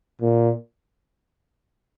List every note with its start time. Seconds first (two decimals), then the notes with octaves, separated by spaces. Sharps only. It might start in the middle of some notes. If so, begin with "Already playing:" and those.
0.21 A#2